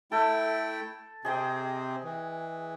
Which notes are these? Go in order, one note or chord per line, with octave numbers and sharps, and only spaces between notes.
A3 E4 A4 G5
C3 C4 G#4 D#5 G5
E3